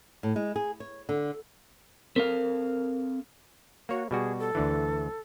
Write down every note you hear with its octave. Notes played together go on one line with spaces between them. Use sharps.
A2
G#3
G#4
C#5
D3
C4 A4 A#4 F5
A#3 F#4 C#5
B2 G3 F#4 G#4
A4
D2 D3 E3